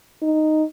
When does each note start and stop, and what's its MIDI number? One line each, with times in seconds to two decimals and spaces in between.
0.22 0.64 63